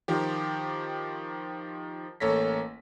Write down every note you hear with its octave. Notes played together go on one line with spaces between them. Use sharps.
D#3 F3 G4
A1 A#3 A4 C#5 A#6 B6